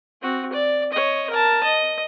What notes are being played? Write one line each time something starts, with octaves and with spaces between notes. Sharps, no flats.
C4 F#4
D5
C#5 D#5
A#4 A5
D#5